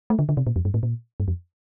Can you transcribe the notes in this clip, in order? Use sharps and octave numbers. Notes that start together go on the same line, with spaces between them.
A3
D3
D3
C3
A#2
F2
G2
A2
A#2
G2
F2